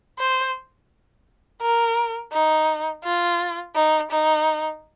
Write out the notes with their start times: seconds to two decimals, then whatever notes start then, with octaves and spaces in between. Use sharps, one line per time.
0.19 C5
1.62 A#4
2.33 D#4
3.04 F4
3.75 D#4
4.11 D#4